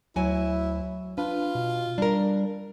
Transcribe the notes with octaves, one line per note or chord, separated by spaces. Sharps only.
D2 F#3 E4 G#5
D4 F4 B4
B2
G3 D4 A#4